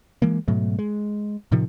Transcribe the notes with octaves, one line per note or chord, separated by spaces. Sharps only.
E3 G#3 A#3
G#2 B2 F#3 A3
G#3
A2 C3 D#3 F3